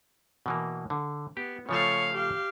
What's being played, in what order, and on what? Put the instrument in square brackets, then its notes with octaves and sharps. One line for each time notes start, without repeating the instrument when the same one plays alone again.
[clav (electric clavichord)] B2 E3 A#3
D3
[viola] B3 [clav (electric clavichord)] G4
[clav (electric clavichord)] C#3 F3 A3 [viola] C#5 F5
[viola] G4 F5